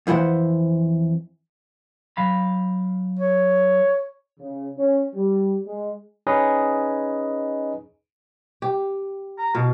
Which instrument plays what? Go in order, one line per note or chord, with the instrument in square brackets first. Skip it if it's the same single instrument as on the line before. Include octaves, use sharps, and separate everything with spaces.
[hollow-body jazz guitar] F2 E3 E4 C5 F#5
[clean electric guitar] F#3 F5 B5
[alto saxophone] C#5
[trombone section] C#3
C#4
G3
G#3
[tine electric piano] C#4 D#4 G#4 B4 D#5
[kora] G4
[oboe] A#5
[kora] B2 [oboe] F5